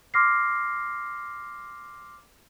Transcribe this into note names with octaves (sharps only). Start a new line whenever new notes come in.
C6 D6 F6 A#6 C7